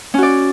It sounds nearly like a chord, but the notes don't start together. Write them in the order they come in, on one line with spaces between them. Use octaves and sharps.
C#4 F#4 D5